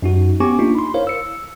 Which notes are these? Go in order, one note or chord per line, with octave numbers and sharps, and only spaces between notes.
F#2 D#4 F#4
B3 C#4 G4 G#5 C#6 D6
A#3 D4 D#4 F4
B5 C6
E4 A#4 C5 C#5 F5
E6 C#7